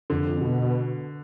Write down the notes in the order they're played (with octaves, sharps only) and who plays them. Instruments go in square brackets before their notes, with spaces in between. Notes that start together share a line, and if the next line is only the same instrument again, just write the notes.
[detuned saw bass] F2 [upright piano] D3
[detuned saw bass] B2